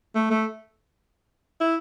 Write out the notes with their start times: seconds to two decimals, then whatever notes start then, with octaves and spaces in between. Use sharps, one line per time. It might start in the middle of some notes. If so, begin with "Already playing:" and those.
0.15 A3
0.30 A3
1.60 E4